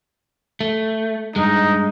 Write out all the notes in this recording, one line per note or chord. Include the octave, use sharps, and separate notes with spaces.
A3
G2 G#3 D#4